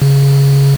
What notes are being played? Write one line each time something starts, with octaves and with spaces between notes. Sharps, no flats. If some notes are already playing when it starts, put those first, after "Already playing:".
C#3